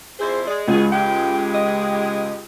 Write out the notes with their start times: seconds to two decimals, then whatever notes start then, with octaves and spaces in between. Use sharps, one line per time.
0.19 F2 E4 G#4 C5
0.47 G#3 D5
0.68 C#2 G#3 B3 F#4 G#4
0.92 G#3 G4 G5
1.54 D#5